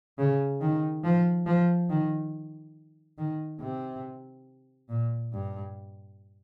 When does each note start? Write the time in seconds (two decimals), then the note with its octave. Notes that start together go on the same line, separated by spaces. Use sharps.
0.18 C#3
0.61 D#3
1.04 F3
1.46 F3
1.90 D#3
3.18 D#3
3.61 C3
4.89 A#2
5.33 G2